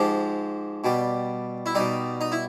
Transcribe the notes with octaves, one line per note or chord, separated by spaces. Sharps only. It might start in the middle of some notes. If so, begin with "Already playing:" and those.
Already playing: G#2 F3 G4
B2 G3
E4
B2 G3 D#4
D#4
E4